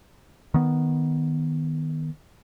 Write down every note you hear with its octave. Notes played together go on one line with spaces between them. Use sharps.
D#3 B3